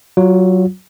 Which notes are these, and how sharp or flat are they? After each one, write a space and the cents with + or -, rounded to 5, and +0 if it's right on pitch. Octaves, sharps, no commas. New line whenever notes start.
F#3 +15 F4 +35